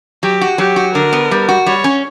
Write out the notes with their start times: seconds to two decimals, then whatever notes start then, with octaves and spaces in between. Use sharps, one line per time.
0.23 F#3 G4
0.41 F#4
0.58 F#3 G4
0.76 F#4
0.95 D3 A#4
1.13 B3
1.31 G3
1.49 F#4
1.66 G3 C#5
1.84 C#4